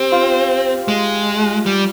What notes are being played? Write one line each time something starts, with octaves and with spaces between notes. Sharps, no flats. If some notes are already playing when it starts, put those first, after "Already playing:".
Already playing: C4 G4
F4
G#3
G3